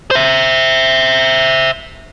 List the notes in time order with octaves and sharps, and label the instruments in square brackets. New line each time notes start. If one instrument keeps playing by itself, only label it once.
[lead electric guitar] C5 E5